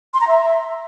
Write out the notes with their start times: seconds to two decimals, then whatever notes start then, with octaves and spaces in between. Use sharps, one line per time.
0.14 C6
0.21 A#5
0.28 E5